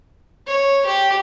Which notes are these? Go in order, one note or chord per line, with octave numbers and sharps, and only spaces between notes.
C#5
G4